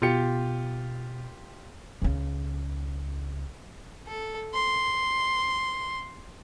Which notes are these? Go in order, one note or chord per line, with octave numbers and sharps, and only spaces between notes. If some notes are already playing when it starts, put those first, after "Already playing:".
B2 F4 G4 C#7
C#2 C#3
A4
C6